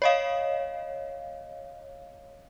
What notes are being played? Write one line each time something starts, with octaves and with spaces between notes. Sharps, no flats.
C#5 D#5 F5